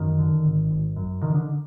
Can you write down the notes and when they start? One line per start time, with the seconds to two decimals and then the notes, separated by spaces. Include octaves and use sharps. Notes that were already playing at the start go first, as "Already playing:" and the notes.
Already playing: F#2 D#3
0.19 D3
0.44 G#1
0.71 G#1
0.96 F#2
1.22 D3 D#3
1.34 D3